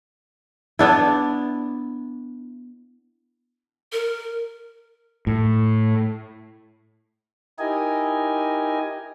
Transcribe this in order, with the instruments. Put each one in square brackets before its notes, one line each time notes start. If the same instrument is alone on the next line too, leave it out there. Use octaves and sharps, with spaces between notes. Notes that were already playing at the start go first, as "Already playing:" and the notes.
[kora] B3 D4 E4
[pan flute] A#4
[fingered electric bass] A2
[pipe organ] D#4 E4 G4 A#4 D#5 G#5